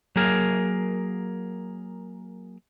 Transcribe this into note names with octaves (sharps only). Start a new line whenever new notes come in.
F#3 A#3 G#4 A#4